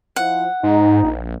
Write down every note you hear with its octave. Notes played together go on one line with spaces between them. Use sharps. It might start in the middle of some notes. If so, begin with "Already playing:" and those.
F3 E4 F#5
G#2 D#4
A#1